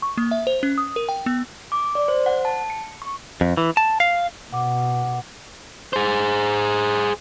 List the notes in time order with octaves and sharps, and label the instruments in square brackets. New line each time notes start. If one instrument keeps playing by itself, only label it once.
[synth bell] C#6
A#3
E5
C5
C#4
D#6
A#4
G5
B3
[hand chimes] D6
D5
C5
F#5
A5
C#7
C#6
[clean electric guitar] F2
E3
A5
F5
[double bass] B2 [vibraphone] F#5 D6
[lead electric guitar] G#4 C5